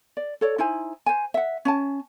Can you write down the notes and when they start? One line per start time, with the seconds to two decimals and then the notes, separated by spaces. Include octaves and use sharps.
0.17 D5
0.41 A4 C#5 D5
0.58 D#4 E4 C5 G#5
1.06 C5 G#5
1.34 E5 F#5
1.65 C#4 G#5 A5